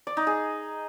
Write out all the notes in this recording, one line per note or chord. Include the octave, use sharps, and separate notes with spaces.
D5
D#4
G#4